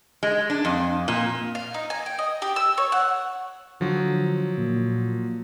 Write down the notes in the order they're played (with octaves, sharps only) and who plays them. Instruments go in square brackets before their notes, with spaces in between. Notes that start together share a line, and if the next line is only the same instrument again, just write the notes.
[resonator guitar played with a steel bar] G#3
D4
F2
A#2
[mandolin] F5
D#4
G#5
G5
D#5
G4
E6
C#5
F#5
[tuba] D3 [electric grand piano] F3 F#3
[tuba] A#2